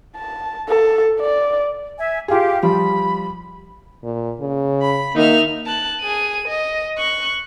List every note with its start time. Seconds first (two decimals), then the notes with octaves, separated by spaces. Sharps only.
0.16 A5
0.69 A4
1.20 D5
1.99 E5 G#5
2.28 F4 G4 G#4 F5
2.63 F3 G3 B5
4.04 A#2
4.40 C#3
4.83 B5
5.16 D#3 A#3 D#4 E5 F6
5.66 A5 F#6
6.00 G#4 D#7
6.48 D#5
6.98 C#6 F#6